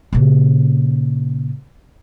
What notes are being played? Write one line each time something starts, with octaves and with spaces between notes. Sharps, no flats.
A#2 C#3